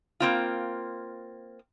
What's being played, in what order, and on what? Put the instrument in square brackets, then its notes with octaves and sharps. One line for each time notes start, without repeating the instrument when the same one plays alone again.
[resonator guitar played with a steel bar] A#3 C4 F4